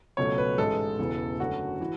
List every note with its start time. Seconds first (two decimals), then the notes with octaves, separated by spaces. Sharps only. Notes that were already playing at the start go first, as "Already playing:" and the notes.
0.17 C#2 B2 F#3 A3 C#5
0.38 B4
0.58 A1 G#2 G#3 A4
0.99 E1 E2 C#3 E3
1.40 F#2 D3 A3 F#4
1.81 E3